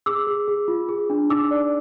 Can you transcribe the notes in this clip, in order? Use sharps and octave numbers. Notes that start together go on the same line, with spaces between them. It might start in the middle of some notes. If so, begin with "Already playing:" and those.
G#4 D6 E6
G#4
G#4
F4
G#4
D4
D#4 D6 E6
D5